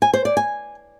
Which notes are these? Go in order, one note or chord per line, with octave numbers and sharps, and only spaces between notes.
G#5
C5
D5
G#5